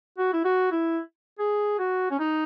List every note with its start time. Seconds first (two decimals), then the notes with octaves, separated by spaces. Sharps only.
0.18 F#4
0.33 E4
0.45 F#4
0.72 E4
1.39 G#4
1.79 F#4
2.11 C#4
2.20 D#4